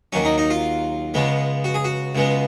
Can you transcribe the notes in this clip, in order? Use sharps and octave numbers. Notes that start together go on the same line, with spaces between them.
D#2 D#3 F#3 C#4
D#4
D#4
F4
C#2 C#3 G#3 B3
F#4
G#4
F#4
C#2 C#3 G#3 B3